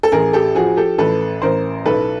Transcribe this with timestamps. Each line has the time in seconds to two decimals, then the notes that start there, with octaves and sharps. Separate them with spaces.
0.03 A4
0.12 A1 G#4 A#4
0.33 G4 A4
0.55 F3 F#4 G#4
0.77 G4 A4
0.98 A1 A4 B4
1.42 A1 A#4 C5
1.85 B1 A4 B4